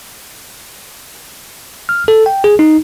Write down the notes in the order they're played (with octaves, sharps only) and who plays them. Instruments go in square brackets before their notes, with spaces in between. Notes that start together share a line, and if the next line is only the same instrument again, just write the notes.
[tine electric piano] F6
A4
G5
G#4
D#4